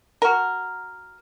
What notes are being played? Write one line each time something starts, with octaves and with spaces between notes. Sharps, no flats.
F#4 A#4